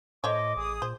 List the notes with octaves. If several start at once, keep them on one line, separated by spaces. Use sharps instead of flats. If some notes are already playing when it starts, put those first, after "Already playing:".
A2 A3 C5 C#5 D#5 D6
A1 G#4 D#6
A#2 C5